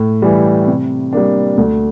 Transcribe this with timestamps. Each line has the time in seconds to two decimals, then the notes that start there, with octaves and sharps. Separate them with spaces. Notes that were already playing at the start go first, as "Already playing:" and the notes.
Already playing: A2
0.22 E3 G3
0.67 C3
1.13 G3 A#3 D4
1.57 D2